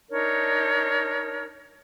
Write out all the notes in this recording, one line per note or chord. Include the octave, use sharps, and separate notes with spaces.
D4 D#4 A#4 C#5